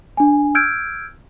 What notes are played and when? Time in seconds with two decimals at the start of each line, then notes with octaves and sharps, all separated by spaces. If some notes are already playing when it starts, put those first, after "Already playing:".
0.17 D4 G#5
0.55 E6 F6 G6 G#6 D7